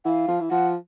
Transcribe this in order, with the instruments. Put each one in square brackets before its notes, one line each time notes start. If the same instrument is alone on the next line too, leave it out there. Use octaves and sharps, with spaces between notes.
[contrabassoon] E3 [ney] F5 F#5
[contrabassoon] F3
E3
[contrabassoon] F3 [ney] F#5